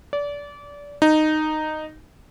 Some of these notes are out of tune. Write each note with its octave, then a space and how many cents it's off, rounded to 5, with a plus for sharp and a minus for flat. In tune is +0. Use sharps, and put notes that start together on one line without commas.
D5 -25
D#4 -10